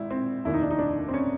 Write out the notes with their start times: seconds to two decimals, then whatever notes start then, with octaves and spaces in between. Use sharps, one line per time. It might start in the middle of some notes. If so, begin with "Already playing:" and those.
Already playing: G#1 G#2 E4
0.10 C4
0.45 F1 D#2 D#3 E4
0.54 D#4
0.62 D4
0.71 D#4
0.79 D4
1.08 C4
1.14 C#4